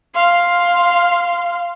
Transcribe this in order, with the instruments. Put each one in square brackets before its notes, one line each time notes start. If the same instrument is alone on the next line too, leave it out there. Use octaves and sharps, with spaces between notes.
[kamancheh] F5 C6